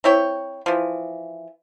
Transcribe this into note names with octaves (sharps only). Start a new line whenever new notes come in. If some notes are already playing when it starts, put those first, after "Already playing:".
C4 E4 C#5 G5
E3 F3